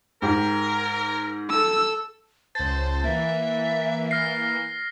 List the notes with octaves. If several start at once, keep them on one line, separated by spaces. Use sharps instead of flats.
G#2 G4 A#4
A4 E6
C#2 C5 A5 A6
E3 A#3 E5
F6 A#6 C7